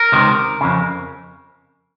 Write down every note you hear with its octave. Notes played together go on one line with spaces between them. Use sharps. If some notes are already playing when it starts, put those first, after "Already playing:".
Already playing: A#4
C#2 C3 D#3
F2 C#3